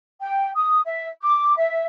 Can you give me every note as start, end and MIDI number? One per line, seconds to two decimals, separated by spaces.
0.21 0.49 79
0.55 0.79 87
0.86 1.07 76
1.22 1.53 86
1.57 1.85 76